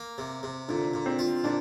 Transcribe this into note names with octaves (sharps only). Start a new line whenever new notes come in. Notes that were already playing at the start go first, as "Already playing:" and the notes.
Already playing: A#3
C3
C3
A#2 D3
A#2
C4
F4
A#2 D4